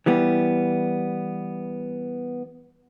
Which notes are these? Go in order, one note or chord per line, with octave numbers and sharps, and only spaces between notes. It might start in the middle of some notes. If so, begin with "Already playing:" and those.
E3 G3 B3